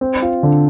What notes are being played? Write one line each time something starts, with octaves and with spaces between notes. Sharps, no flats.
C4
F4
D3